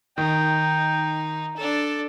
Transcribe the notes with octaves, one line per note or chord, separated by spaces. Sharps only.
D#3 D#4 G5
D4 A4